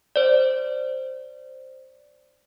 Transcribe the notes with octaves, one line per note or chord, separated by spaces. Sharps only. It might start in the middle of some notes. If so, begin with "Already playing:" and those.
C5 D5